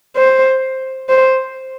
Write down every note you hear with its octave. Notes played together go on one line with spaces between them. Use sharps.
C5
C5